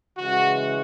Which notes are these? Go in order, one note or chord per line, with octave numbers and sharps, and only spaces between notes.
C#3 E3 G#3 F#4